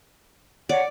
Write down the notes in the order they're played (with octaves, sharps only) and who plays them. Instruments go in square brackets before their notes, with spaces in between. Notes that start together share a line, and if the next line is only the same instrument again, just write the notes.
[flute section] C#5 F#5 [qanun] D5